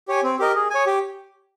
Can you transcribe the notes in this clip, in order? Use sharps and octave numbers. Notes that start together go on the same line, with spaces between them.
G4 C#5 G#5
C4
G4 A#4 D#5
G#4
C#5 G#5
G4